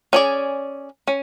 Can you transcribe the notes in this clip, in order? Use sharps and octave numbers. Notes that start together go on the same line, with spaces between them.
C#4 G#4 D5
C#4